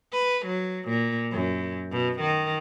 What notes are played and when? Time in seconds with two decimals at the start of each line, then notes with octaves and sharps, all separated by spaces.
0.12 B4
0.46 F#3
0.88 A#2
1.32 F#2
1.92 B2
2.20 D#3